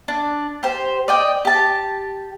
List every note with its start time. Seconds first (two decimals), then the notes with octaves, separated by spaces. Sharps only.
0.08 D4
0.63 G4 C5
1.08 D5 D#5 G5
1.45 G4 A5